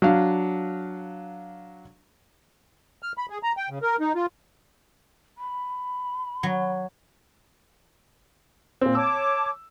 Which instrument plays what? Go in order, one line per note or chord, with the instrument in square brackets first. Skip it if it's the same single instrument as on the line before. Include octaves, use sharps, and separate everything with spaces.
[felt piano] F#3 D4 F5
[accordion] F6
B5
G#4
A#5
G5
C#3
A#4
D#4
F4
[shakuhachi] B5
[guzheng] F#3
[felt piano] A#2 C4
[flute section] C#5 A5 D6 [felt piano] E6